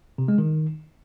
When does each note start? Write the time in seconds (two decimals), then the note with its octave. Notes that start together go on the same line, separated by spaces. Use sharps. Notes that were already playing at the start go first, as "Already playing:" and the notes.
0.18 C3
0.28 G#3
0.38 D#3